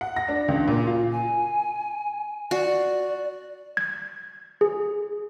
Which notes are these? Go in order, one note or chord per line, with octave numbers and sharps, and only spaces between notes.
F#5
A#6
D4
C#2
A#2
F4
G#5
F#4 D5
G#6
G#4